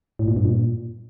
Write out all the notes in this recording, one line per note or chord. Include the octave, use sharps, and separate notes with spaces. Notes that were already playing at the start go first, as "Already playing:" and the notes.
A2
A#2
G2
A#2